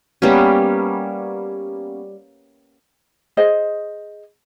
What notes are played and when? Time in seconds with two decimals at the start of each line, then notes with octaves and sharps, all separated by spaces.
0.22 G3 A#3 B3 C#4
3.37 G#4 C5 D#5